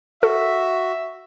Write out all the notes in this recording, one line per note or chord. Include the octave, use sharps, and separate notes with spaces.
F#4 A4 E5